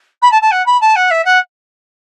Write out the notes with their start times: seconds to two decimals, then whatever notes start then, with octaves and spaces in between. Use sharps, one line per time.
0.22 B5
0.32 A5
0.42 A5
0.51 F#5
0.66 B5
0.81 A5
0.96 F#5
1.11 E5
1.25 F#5